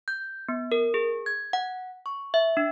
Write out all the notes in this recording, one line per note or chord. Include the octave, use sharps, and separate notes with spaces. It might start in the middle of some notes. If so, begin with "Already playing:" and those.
G6
B3
A#4
G#4
G#6
F#5
C#6
E5
D4